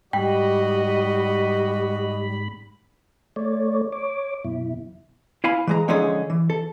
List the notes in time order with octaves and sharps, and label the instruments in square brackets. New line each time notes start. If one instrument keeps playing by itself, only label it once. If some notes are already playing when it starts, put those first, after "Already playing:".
[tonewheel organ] G#2 B5 [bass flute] G3 [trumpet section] F#4 D#5 [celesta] G5
[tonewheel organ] A3 C#5 D5
C#5 D6
F#2 B2 E4
[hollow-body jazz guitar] E4 F5 G#5 B5
E3 G#3 A#5
D3 F3 G#3 C#4 D#4 G#4
E3
A4